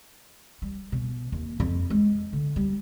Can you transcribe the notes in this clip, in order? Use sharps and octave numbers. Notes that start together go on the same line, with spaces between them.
G3
B2
D#2
F2
G#3
D3
G3